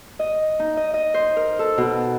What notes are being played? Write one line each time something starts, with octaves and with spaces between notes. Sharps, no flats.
D#5
D#4
D#5
D#5
C5
A#4
A4
B2